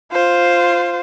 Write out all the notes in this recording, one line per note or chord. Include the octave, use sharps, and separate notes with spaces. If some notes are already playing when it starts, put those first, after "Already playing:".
F4 C5